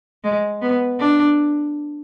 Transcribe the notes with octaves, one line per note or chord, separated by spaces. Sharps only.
G#3
B3
D4